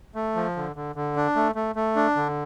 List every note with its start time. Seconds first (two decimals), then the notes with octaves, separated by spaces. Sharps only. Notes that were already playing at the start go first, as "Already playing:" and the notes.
0.15 A3
0.36 F3
0.56 D3
0.76 D3
0.96 D3
1.16 D4
1.36 A3
1.55 A3
1.75 A3
1.96 D4
2.16 D3